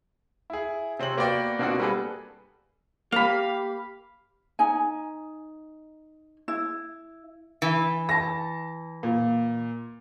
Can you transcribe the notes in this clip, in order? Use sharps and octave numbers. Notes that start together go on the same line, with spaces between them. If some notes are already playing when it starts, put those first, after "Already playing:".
E4 G#4
C3 C4 C#5 F#7
A#3 B3 F#4 D5 G5
B2 A#3 C4 D4 F4 F#4
G3 A#3 G#4 A4 B4
A#3 G4 F5 B5
D#4 G#5
E4
E3
A5 A#6
A#2